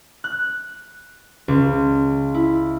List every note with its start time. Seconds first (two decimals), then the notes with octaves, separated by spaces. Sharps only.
0.24 F#6
1.48 C#2
2.34 E4